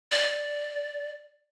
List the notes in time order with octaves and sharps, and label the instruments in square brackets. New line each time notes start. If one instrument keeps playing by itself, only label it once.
[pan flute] D5